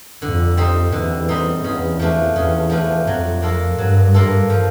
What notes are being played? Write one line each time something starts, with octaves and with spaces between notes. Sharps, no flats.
F2 D3
G3 C4 D#4
E2 D3
G3 C4 D#4
E2 C#3
F3 A3 D4
E2 C#3
F3 A3 D4
F2 F#3
A#3 D4 F4 A4
G2 F#3
A#3 D4 F4 A4
F3